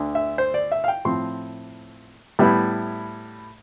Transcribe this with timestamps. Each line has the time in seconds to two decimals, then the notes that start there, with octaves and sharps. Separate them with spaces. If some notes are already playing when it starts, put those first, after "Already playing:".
Already playing: D2 D3
0.15 E5
0.38 C5
0.54 D5
0.72 E5
0.84 F5
0.88 G5
1.05 A2 F3 C4 C6
2.39 A2 G3 B3 E4